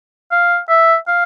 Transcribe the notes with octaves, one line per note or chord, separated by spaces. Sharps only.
F5
E5
F5